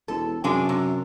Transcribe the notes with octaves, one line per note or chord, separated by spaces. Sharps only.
E1 A4
F#2 C3 G#3 D4
C3